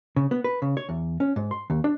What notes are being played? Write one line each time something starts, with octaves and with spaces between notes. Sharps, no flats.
C#3
B3
B4
C#3
C#5
E2
C#4
G#2
C6
D#2
D4